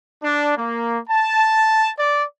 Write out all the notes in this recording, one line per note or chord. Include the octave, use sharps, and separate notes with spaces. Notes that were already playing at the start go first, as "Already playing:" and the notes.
D4
A#3
A5
D5